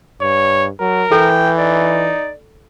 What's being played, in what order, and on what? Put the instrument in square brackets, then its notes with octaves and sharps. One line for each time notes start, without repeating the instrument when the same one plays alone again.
[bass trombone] G2 [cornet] C#5
[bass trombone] F#3 [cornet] A#4
[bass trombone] E3 [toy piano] A4 [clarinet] G5
[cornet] D#4 [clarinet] D5